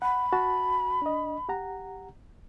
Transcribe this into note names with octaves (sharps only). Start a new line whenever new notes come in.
F#5 B5
F#4 A5
D4 D#5
G4 F#5 A#5